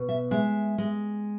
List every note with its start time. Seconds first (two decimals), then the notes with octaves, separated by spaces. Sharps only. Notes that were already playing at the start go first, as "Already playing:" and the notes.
Already playing: B2
0.09 E5
0.31 G#3 E5
0.78 G#3